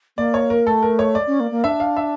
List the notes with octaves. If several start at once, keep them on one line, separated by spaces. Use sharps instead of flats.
A#3 D5
C#5
A#4
A3 A4
A#4
C#5
D5
C#4
A#3
A#3
D4 E5
F5
E5